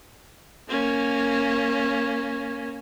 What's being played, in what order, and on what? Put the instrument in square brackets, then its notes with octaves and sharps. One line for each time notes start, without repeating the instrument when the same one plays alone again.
[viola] A#3 C#4